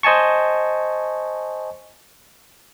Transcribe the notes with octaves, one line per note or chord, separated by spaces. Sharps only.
C5 D#5 G#5 A5 C#6